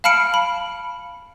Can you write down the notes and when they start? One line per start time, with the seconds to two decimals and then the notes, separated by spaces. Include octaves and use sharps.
0.04 F5 A5 B5 F6 C#7 D7
0.34 B5